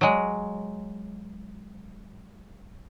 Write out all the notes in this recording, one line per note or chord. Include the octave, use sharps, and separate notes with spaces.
F#3 G#3